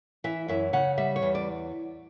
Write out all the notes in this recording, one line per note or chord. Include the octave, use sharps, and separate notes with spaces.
E3 E5
F#2 E5
C#3 F#5
G3 E5
C#5
E2
D5